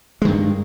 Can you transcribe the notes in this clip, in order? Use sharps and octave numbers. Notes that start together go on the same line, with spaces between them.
G2 D#3 G#3